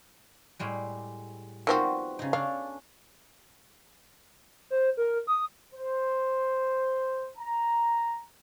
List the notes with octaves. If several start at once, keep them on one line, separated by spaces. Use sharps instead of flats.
A2 G3 G#3
D#3 F3 G3 B3 C4 F#4
C#3 D#4
C#4 D4 A4 F5
C5
A#4
D#6
C5
A#5